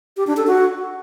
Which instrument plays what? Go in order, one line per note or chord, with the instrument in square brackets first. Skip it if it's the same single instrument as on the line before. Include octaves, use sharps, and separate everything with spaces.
[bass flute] G4
D4
A4
F#4